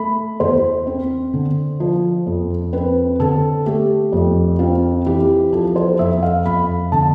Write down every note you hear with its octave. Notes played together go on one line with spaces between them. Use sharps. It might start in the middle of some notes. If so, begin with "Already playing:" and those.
Already playing: A3 B5
E2 C5
C4
D3
F3
F2
C4 B4
D3 A4
A3 G4
F2
C4 F4
E3 G4
F3 A4
C5
F2 E5
F5
F2 B5
D3 A5